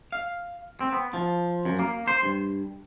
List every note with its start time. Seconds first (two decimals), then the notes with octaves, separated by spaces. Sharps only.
0.12 F5
0.81 C4
0.93 B3
1.14 F3
1.65 F#2
1.79 A#3
2.08 C5
2.22 G2